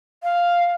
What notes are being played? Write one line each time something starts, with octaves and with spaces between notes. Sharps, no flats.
F5